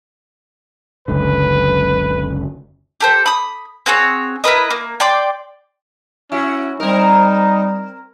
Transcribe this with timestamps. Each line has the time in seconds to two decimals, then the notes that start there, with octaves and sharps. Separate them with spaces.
1.08 F#1 C#2 D3 B4
3.00 G4 A4 C5
3.26 B5 D#6
3.86 C4 F#4 G#4 C#5
4.44 E4 A#4 B4 D#5
4.70 A#3
5.00 D5 G5 C6 D6
6.32 C#4 E4 F#4
6.80 G3 C4 D#4 A#4